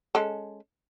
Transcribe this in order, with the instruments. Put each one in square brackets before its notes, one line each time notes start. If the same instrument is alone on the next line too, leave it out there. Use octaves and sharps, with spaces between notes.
[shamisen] G#3 C#4 A4